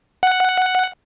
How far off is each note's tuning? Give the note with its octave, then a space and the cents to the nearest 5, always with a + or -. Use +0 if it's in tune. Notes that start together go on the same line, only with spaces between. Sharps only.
F#5 +0